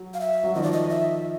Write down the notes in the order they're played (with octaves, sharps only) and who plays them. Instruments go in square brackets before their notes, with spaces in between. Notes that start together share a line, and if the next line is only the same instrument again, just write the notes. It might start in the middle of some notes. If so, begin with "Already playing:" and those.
Already playing: [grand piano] F#3
[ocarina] F5
E5
[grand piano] F#3
[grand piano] D#3 F3 [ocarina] D#5
[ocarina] D5
D#5
E5